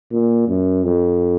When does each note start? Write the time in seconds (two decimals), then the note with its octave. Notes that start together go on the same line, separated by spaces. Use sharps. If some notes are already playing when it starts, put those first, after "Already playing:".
0.11 A#2
0.48 F#2
0.85 F2